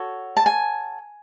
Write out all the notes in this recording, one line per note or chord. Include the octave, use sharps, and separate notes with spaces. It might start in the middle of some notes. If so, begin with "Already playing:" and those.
Already playing: F#4 A4 C#5
A5
G#5